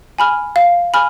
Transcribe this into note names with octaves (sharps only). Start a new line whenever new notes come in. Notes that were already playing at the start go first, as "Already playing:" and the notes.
G#5 B5 F6
F5
G#5 B5 F6